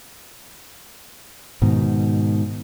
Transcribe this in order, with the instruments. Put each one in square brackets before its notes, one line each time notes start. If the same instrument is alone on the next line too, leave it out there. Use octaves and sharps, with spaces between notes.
[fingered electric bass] G#2 B2 D#3